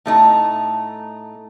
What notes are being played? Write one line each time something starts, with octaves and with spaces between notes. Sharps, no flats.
A2 A3 D#4